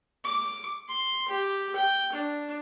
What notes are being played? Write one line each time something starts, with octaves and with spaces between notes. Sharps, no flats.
D6
C6
G4
G5
D4